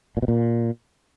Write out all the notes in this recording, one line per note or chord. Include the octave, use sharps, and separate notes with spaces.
A#2
B2
A#2